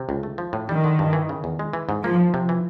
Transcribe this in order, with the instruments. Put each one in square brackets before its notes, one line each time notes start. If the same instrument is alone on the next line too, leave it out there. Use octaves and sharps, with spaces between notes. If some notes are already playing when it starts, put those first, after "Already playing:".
Already playing: [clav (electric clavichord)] C3
C#2
A3
F3
A2
[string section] D#3 [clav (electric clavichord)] G3
[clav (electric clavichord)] D3
G2
E3
C#3
E2
G#3
E3
G#2
[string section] F3 [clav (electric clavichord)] A#3
[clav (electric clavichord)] F3
C3
E3